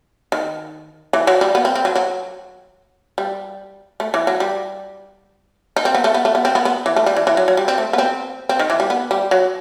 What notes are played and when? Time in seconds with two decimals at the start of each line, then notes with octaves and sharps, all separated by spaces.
0.32 D#3
1.13 E3
1.27 F#3
1.41 G3
1.55 B3
1.65 C4
1.75 C4
1.85 F#3
1.96 F#3
3.18 G3
4.00 A3
4.14 E3
4.27 F#3
4.40 G3
5.76 D#4
5.85 C4
5.95 B3
6.04 A3
6.14 B3
6.25 A3
6.35 B3
6.45 C4
6.55 B3
6.65 B3
6.86 E3
6.96 A3
7.06 G3
7.16 E3
7.27 E3
7.37 F#3
7.48 F#3
7.57 G3
7.68 C4
7.78 A3
7.93 B3
7.98 C4
8.49 C4
8.59 D#3
8.70 E3
8.80 G3
8.90 B3
9.11 G3
9.31 F#3